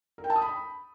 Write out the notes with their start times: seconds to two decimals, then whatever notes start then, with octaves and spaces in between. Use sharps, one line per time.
0.18 A#4
0.24 G5
0.30 A5
0.36 D#6
0.42 B5